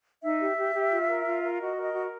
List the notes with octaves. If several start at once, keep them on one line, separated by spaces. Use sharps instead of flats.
D#4 E5
G4
G4
G4
F4
A#4
F4
A#4
F#4 D#5
A#4
D#5
F#4